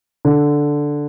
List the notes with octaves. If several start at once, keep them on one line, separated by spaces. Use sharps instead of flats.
D3